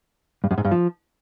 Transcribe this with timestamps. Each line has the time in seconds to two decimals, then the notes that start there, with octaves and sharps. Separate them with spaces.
0.44 G2
0.51 F#2
0.58 G#2
0.65 G2
0.71 F3